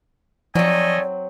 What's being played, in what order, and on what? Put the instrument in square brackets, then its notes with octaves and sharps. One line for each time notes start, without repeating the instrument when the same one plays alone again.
[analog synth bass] F3 [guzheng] F#3 C4 [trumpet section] A3 D#5 G#5 [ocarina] D5